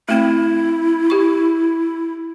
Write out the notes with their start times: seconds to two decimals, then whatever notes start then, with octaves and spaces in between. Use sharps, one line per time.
0.09 A3 C4 E4
1.10 G4 C#6